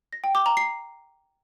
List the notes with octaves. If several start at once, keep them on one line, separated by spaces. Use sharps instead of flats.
A#6
G5
D6
A#5
C7